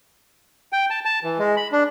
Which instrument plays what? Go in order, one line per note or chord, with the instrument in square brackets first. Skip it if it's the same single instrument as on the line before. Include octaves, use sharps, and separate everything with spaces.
[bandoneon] G5
A5
A5
E3
G#3
B5
D4